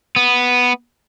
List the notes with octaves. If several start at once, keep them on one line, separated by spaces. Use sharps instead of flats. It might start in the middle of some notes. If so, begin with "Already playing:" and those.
B3